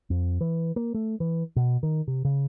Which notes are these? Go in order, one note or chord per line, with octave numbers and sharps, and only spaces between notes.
F2
E3
A#3
A3
E3
B2
D#3
C3
C#3